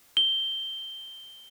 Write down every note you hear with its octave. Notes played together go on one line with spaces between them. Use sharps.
G7